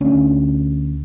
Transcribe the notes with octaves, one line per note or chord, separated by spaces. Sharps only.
D2 C#4 D4